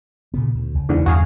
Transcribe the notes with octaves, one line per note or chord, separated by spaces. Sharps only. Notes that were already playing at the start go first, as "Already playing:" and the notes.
A#2 C#3 B3
D2
C#2
E2 G#2 D3
E2 G2 D3 F#4 G#4 F5